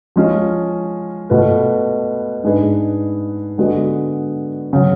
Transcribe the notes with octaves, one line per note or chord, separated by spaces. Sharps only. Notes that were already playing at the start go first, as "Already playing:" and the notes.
F3 G#3 C#4 F4
B2 A3 F4 B4
G#2 G#3 D4 G#4 B4
D3 G#3 B3 F#4
C#3 F#3